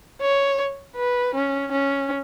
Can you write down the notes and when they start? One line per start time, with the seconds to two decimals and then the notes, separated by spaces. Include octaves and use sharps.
0.21 C#5
0.97 B4
1.35 C#4
1.72 C#4